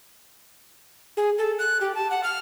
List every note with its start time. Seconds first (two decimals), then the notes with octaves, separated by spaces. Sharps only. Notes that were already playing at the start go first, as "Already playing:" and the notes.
1.17 G#4
1.38 A4
1.59 F#6
1.81 G4
1.95 A5
2.11 F#5
2.24 F6